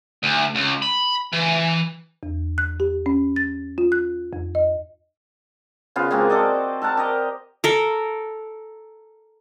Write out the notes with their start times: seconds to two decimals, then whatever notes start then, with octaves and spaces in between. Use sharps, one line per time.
0.23 D2
0.55 C#2
0.82 B5
1.33 E3
2.23 E2
2.58 F#6
2.80 G4
3.06 C#4
3.36 A6
3.78 F4
3.92 F#6
4.33 F2
4.55 D#5
5.96 C#3 B3 F4 C5
6.11 G#3 A#3 C4 F#4
6.30 A4 D5 D#5
6.82 A4 A#4 F#5 A5
6.97 G4 A#4 D#5
7.64 A4 A#4